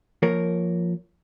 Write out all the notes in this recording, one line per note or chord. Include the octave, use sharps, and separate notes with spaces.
F3 A#3 A#4 C#5